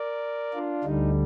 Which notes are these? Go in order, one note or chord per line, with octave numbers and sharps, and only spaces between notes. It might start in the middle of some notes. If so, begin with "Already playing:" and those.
Already playing: A#4 D5
D4 F4
D2 D3 G3 D#4